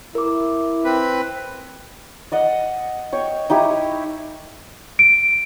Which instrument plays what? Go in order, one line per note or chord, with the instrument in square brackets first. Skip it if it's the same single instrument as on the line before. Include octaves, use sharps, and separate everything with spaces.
[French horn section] E4 [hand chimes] A#4 D6
[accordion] C4 B4
[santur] D5 D#5 F#5
C#5 G5
D#4 E4 G4 D#6
[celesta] D7